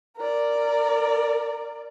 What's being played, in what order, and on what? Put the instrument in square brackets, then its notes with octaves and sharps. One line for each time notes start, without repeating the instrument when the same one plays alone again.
[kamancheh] A#4 D5